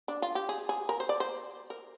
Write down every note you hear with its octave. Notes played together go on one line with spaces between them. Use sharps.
D4
F4
G4
G#4
G#4
A#4
C5
D5
C5
A#4